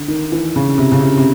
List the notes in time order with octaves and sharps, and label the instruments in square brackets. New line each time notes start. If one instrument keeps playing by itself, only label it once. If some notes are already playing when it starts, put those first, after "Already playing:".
Already playing: [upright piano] D3
D#3
E3
C#3
C3
C#3
C3
C3